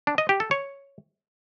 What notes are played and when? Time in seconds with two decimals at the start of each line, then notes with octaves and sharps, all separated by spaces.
0.07 D4
0.18 D#5
0.29 G4
0.40 A4
0.51 C#5